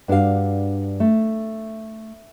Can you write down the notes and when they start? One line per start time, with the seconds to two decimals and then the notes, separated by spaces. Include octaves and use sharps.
0.08 G2 D4 F#4 A4 F5
1.00 A3